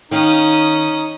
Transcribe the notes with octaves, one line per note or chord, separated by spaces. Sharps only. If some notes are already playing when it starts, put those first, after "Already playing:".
D#3 C#4 D#4 F5 D#6